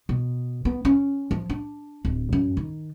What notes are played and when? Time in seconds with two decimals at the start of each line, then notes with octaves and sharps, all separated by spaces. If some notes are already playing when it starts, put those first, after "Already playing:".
0.09 B2
0.65 B3
0.85 C#4
1.31 F3
1.50 D4
2.05 D1
2.33 F#2
2.57 D#3